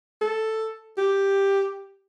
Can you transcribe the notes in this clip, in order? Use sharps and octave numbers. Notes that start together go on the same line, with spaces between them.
A4
G4